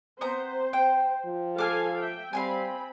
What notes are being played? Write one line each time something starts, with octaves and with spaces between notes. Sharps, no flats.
B3 C4 C5 A#5
G5
F3
A4 F5 G#5 D6 F6
E5 G5
G3 C4 F5 G5 G#5 B5